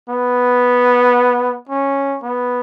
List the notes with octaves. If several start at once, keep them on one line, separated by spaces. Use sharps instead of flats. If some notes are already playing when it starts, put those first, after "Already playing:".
B3
C#4
B3